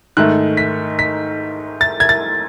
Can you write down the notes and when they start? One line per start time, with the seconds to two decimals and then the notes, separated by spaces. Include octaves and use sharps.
0.17 G#2 D#3 A3 F#6
0.57 B6
0.99 B6
1.81 A6
2.00 G#6
2.09 A6